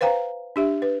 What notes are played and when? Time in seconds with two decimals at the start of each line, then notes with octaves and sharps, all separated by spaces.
0.01 B4 C5 F5 G5 A#5
0.56 D4 G4 E5
0.82 B4